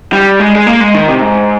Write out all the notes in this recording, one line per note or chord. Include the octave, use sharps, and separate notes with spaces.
G3
G#3
G#3
A#3
G#3
D#3
C3
G#2